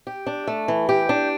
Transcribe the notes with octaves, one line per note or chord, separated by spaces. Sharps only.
G4
D4
A3
E3
G4
D4